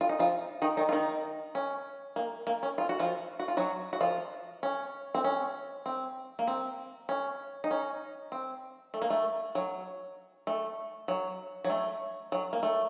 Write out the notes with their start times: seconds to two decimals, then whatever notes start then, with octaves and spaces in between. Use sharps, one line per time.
0.01 F4
0.09 D#4
0.19 F3 F4
0.62 D#3 D#4
0.77 D#3 D#4
0.89 F4
0.92 D#3 D#4
1.55 C#4
2.16 A#3
2.47 A#3
2.63 C#4
2.78 F4
2.89 F#4
2.99 F3 F4
3.40 F#4
3.48 F4
3.57 F#3 F#4
3.93 F#4
4.01 F3 F4
4.63 C#4
5.15 C4
5.24 C#4
5.86 C4
6.39 A#3
6.48 C4
7.09 C#4
7.64 D#4
7.71 C#4
8.32 C4
8.94 A3
9.02 A#3
9.10 A3
9.55 F#3
10.47 A3
11.08 F#3
11.64 F#3
11.70 A3
12.32 F#3
12.53 A#3
12.63 A3